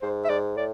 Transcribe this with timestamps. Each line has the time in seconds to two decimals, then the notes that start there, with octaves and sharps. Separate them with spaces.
0.02 G#2 C5
0.25 E5
0.29 G#2 D5
0.57 A2 D5